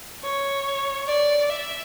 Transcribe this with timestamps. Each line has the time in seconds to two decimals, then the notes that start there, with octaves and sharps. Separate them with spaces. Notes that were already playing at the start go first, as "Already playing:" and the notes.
0.23 C#5
1.07 D5
1.50 E5